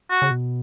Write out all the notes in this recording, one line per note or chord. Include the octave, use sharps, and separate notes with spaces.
F#4
C#3
B2